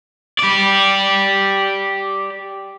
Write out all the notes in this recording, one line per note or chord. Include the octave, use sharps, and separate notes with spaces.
G4 D5